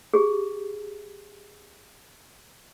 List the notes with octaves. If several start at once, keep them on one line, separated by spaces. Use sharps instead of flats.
G4 G#4